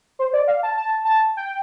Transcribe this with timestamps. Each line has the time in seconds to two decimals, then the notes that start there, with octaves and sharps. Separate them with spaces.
0.19 C5
0.33 D5
0.48 F5
0.63 A5
0.77 A5
1.05 A5
1.37 G5